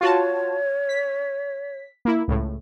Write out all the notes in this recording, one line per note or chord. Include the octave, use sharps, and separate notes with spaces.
F4 F#4 C#5 A5
B6
A#3 E4
C#2 A2